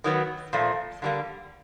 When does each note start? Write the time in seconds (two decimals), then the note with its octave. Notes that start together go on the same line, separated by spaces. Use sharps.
0.04 D#3 F#3 B3
0.53 A#2 F3 A3 C4
1.02 D3 G3 A#3